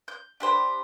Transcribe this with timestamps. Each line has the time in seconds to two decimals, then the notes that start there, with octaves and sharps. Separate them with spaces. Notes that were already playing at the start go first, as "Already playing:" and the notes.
0.08 G6
0.40 D4 G4 C5 B5